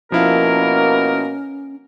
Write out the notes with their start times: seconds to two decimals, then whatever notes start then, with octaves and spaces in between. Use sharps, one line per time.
0.12 B2 F3 A#3 C#4 E4 A#4 F5